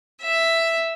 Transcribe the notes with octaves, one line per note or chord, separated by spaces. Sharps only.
E5